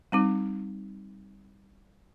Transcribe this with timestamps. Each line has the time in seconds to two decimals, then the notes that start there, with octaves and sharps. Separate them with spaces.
0.12 G3 C4 D#4